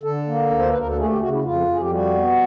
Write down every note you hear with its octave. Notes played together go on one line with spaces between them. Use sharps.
D3 A4
A#3
D2
C5
B4
D2 A#4
A4
A3 G#4
G4
C#3 F#4
E4
F2 F4
F2 G#4
G4
G3 F#4
B3